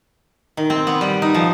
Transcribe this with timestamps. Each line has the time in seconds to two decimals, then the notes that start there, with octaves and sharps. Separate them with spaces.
0.57 D#3
0.70 C4
0.87 B3
1.01 G3
1.22 D#4
1.34 F3